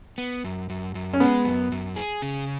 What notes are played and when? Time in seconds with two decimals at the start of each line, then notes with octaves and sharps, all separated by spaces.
0.18 B3
0.44 F#2
0.70 F#2
0.95 F#2
1.13 C#4
1.20 G#3 B3
1.45 F#2
1.72 F#2
1.96 G#4
2.22 C#3